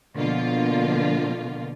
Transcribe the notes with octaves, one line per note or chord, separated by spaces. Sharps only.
B2 D3 F3 A#3 F4